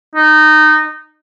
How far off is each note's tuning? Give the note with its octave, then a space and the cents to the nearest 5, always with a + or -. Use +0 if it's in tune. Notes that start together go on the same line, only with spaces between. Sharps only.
D#4 -20